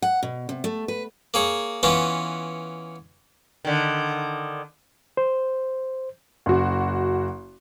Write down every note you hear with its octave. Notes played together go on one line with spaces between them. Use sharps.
F#5
B2
C3
A3
B4
A#3 G#4 C#5
E3 B3 C#4 F4
D3 D#3
C5
F#1 F#4